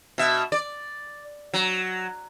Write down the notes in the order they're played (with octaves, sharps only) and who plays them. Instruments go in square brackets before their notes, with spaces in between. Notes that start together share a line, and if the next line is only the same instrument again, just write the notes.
[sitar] B2 E5
D5
F#3